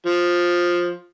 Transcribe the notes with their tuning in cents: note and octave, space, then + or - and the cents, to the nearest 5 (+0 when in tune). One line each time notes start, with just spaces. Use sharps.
F3 +10